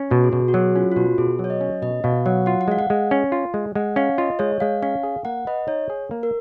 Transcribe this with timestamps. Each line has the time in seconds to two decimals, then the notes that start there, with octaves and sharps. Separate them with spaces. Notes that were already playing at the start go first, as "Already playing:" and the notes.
Already playing: C#4
0.11 B2 F#4
0.24 G#4
0.32 B2 F#4
0.48 F#4
0.54 F#3 G#4
0.76 C#4 F4
0.92 F4
0.96 B2 F#4
1.18 B2 G#4
1.39 F#3
1.44 C#5
1.50 D#5
1.61 C#4
1.82 B2 D#5
2.04 B2 F5
2.26 F#3 F#5
2.46 F4 F#5
2.61 F#5
2.68 G#3 F5
2.79 F#5
2.90 G#3
3.11 C#4
3.32 F4
3.54 G#3
3.75 G#3 F#5
3.96 C#4 F5
4.18 F4 D#5
4.39 G#3 C#5
4.60 G#3 F5
4.82 C#4 F5
5.03 G#4
5.25 A#3 F#5
5.47 B4 D#5
5.68 D#4 C#5
5.90 G#4
6.11 A#3
6.23 A#4